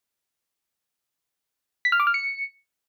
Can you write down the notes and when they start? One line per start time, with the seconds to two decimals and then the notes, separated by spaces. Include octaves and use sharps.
1.85 B6
1.92 F6
2.00 D6
2.07 F6
2.14 C#7